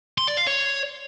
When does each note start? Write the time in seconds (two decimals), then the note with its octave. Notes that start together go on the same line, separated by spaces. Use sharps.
0.18 C6
0.28 D5
0.37 F5
0.47 C#5